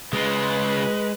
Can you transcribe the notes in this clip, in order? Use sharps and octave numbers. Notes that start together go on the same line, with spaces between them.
C#3 G#3 F4 B4